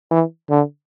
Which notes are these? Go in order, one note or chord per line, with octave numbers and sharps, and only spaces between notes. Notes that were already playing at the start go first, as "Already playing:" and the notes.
E3
D3